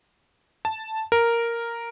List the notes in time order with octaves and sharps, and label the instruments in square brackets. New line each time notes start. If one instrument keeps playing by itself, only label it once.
[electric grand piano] A5
A#4